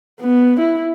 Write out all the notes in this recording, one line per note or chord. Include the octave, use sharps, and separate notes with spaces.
B3
E4